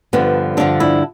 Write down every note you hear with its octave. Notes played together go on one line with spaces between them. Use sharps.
G2 D3 F3 B3
G2 D3 F3 D4
E4